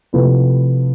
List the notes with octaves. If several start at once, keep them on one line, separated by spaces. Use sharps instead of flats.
C3 F3 A3 E4 B4